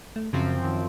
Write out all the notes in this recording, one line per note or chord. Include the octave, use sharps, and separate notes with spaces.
A3
F#2 C#3 F3 C4
D#3